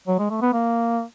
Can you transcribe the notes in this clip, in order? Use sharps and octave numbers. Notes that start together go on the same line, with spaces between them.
F#3
G#3
A3
B3
A#3